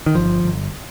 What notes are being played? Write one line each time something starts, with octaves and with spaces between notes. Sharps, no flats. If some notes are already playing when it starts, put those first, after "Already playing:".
D#3
G1 F3
G1